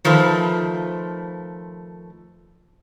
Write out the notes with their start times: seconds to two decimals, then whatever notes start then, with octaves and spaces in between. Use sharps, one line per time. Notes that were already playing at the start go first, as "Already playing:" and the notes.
0.05 D#3 F3 A3 B4 C5